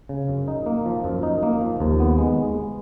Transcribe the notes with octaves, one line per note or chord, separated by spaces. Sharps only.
C#3
F#2
D#4
A#3
F3
F#2
D#4
A#3
F3
D#2
B3
G#3